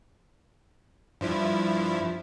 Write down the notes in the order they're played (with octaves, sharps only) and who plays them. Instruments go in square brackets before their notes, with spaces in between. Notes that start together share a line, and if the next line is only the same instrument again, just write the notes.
[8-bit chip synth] G2 F3 E4